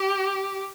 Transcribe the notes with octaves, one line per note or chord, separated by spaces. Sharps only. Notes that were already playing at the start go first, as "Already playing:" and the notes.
Already playing: G4